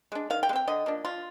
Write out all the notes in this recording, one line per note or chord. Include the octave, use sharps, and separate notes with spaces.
G#3 D4
D#3 F5
G5
G#3
C4 G5
D3 D#5
F3 A#3 D4
F3 F4